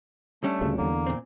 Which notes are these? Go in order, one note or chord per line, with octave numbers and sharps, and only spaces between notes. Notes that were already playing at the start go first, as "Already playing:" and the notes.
G3 A3 C#4 D4
D2 A#2 C#3
E2 D3 A#3
A#2 C4